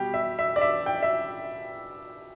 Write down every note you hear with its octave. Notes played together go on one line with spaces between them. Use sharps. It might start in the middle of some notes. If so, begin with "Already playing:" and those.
Already playing: B2 G3 G4
E5
E5
D5
E5
G5
E5